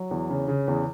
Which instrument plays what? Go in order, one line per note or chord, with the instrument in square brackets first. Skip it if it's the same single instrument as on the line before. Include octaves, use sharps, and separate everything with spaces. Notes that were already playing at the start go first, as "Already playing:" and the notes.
Already playing: [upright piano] F#3
E2
C#3
C#3
E2